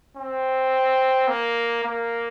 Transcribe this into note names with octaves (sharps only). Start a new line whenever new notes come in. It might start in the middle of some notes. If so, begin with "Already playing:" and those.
C4
A#3
A#3